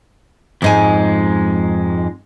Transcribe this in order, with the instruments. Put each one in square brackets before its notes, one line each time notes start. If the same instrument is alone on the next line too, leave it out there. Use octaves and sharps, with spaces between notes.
[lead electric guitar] F2 G#3 [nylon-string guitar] G#2 D#4 G#5